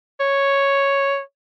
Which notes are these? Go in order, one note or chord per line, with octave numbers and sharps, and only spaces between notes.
C#5